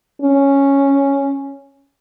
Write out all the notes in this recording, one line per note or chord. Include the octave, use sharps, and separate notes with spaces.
C#4